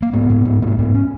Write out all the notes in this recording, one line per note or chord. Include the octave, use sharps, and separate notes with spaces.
A#3
G#2 B3
G#2
G#2
G#2 A#3
G#2 B3
C#4